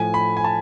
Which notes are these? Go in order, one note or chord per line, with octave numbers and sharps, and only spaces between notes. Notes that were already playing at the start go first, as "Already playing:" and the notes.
Already playing: A2 F3 A3 G#5
B5
G#5
A5